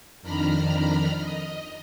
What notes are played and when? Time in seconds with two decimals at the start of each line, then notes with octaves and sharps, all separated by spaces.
0.22 F2 D#3 D4 A#5 B5 F6
1.19 D#5